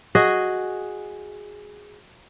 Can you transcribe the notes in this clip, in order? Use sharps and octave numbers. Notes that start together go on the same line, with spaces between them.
F#4 G#4 D#5